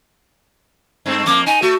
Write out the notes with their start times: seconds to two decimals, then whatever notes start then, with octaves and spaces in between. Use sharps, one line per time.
1.06 G2 A3 C4
1.26 F2 A#3 D6
1.46 D#4 G#5
1.62 A3 F#4